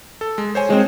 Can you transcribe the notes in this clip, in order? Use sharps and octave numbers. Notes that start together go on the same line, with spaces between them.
A4
G#3
C5 C#5 G#5
G#3 C4